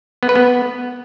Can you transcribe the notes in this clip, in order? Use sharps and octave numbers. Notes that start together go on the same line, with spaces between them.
B3
B4
B3